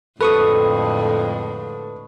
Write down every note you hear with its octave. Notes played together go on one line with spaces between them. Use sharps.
F2 A2 D3 G#3 A4 B4 C#6 D#6